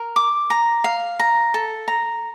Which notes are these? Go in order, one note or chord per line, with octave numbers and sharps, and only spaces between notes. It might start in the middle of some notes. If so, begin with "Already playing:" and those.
Already playing: A#4
D6
A#5
F5
A#5
A4
A#5